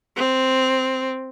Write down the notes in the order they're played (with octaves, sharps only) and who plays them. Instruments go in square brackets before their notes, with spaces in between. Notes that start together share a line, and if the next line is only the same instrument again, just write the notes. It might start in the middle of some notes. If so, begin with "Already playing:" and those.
[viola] C4